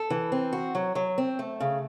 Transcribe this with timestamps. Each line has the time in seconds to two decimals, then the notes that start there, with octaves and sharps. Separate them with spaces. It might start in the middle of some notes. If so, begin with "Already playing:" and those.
Already playing: A4
0.10 E3
0.32 C4
0.53 F#4
0.75 F#3
0.95 F#3
1.18 C4
1.39 A3
1.60 C#3